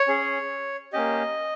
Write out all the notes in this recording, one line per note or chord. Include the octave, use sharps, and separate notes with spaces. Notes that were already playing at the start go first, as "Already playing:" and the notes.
Already playing: C#5
C#4 G#4
A#3 C#4 G4 D#5